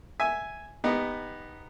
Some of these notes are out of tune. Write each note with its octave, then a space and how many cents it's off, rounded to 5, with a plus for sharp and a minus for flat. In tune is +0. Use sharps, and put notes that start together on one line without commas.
E5 +0 G#5 +0
B3 +0 D#4 +0 G4 +20